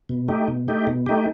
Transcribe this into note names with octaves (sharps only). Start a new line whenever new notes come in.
B2
A3 D#4 G4
B2
A3 D#4 G4
B2
A3 D#4 G4